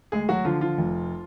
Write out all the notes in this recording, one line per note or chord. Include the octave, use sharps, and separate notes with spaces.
D2 G#3 G#4
F#3 F#4
D3 F3 F4
F3 F4
F1